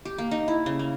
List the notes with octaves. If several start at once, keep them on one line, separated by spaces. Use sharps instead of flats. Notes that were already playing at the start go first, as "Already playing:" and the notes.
G4
A#3
D#4
E4
C#3
A#3